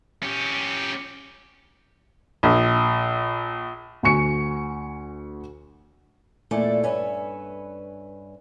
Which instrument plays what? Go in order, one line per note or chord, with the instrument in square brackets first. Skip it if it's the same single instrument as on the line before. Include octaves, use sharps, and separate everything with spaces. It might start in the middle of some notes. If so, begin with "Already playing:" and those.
[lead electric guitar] C#4 G4
[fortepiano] A#1
[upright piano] D2 G#5 C#6 C#7
[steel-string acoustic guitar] E2 A#2 A3 E4 D5 G#5
G2 C#4 B4 E5 G#5